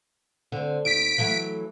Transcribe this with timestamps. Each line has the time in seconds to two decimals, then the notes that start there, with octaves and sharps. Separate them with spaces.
0.52 D3 C4
0.85 D#2 B6 D7
1.18 E3 F#3 A3